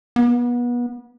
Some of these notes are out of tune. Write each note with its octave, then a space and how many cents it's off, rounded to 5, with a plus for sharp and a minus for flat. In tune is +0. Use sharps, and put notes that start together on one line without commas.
B3 -30